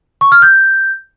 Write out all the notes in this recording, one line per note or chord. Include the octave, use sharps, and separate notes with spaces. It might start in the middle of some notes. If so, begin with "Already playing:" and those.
C#6
F6
G6